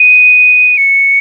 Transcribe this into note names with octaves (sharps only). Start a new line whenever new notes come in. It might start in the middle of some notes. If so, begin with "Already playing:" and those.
Already playing: D#7
C#7